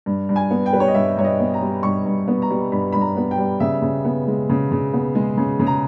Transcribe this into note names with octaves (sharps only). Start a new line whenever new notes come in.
G2
G2
G#5
B3
G5
G3 B4
C#5
D#5
G2 E5
G2 C#5
D#5
B3
A#5
G3
G2 C#6
G2
B3
A#5
G3
G2 B5
G2 B5
A#5
B3
G5
G3
C#3 E5
C#3
B3
G#3
C#3
C#3
B3
G#3
C#3
C#3
A#5